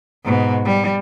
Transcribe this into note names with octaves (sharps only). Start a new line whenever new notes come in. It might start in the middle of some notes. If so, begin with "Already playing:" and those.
G#2 B2
G3